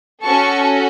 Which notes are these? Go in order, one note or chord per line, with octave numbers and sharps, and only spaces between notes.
C#4 F#4 A4 A5 C#6